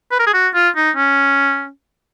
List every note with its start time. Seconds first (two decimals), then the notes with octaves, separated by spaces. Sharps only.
0.11 B4
0.19 A#4
0.26 G#4
0.34 F#4
0.54 F4
0.76 D#4
0.96 C#4